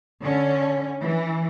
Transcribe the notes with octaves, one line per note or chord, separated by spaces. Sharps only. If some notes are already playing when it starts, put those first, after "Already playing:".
D3 C#4
E3